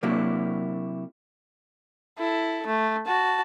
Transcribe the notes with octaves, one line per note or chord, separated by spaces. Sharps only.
C3 F#3 A#3 D4 E4 F#4
E4 A4
A3
F#4 A5